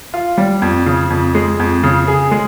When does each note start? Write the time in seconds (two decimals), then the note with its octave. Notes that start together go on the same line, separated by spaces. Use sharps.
0.14 F4
0.38 G3
0.62 F2
0.86 C#3
1.10 F2
1.35 G#3
1.59 F2
1.83 C#3
2.08 G#4
2.31 G#3